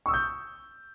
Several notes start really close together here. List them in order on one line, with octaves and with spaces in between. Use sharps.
C#6 E6 D#6 G6